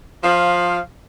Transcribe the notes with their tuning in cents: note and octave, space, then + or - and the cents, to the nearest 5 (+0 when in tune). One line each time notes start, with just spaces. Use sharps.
F3 +15 F5 +0